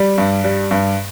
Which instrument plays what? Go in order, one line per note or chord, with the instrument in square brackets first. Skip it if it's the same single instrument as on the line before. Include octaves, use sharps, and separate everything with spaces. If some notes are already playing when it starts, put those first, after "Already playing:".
Already playing: [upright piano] G3
G2
G3
G2